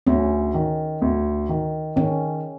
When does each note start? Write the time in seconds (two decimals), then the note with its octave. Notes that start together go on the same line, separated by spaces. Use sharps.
0.07 D2 C#4
0.54 D#3
1.02 D2
1.49 D#3
1.96 D#3 C#4